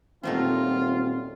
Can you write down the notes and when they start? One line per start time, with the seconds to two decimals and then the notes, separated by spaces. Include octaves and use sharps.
0.23 D#1 F#3 A3 C4 D#4 F4